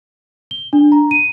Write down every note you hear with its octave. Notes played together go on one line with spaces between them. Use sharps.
G7
D4
A#5
D#7